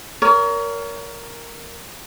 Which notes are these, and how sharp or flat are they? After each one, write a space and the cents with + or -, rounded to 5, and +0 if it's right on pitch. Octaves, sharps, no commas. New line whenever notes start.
A#4 +0 C#5 +35